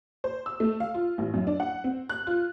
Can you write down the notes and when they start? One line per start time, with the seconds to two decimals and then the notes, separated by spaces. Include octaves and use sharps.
0.24 C5
0.46 E6
0.60 A3
0.80 F5
0.94 F4
1.18 A1
1.34 F#2
1.47 D4
1.60 F#5
1.84 C4
2.09 F#6
2.27 F4